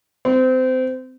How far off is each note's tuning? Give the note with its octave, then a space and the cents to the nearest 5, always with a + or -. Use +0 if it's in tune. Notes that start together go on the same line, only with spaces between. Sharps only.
C4 -25